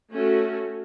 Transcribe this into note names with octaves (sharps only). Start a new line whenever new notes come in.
A3 C#4 F#4